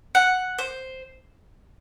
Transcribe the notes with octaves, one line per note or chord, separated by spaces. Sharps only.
F#5
C5